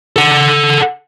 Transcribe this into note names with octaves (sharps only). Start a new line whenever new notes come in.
A4 F#5